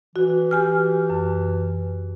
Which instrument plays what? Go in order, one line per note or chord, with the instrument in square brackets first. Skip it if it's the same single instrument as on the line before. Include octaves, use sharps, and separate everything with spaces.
[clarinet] E3 [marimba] F#4
[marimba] G4 G#5 F6
F#2